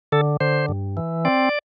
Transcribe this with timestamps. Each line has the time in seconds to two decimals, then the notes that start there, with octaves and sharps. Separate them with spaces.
0.12 D3 A4
0.40 D3 C5
0.68 G2
0.97 E3
1.25 C4 D5